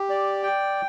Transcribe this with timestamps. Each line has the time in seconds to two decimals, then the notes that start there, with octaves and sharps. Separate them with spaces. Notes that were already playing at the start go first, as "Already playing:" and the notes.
Already playing: G4
0.10 D5
0.43 G5